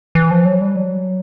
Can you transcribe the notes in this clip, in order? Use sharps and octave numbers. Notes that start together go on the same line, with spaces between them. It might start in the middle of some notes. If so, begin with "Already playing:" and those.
E3
F3
F#3
G3
F#3